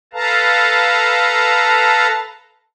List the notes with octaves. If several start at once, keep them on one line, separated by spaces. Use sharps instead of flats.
A4 B4 F5 A5 A#5